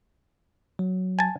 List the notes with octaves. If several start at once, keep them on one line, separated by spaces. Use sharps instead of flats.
F#3
G#5 A5